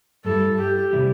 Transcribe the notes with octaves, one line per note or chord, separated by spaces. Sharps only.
G2 G3 E4 A4
G4
C3 E3 G3 E4 G4